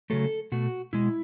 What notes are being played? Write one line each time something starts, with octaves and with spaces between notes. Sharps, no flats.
C#3 F#3 A3 A4
B2 A3 F#4
B2 G#3 E4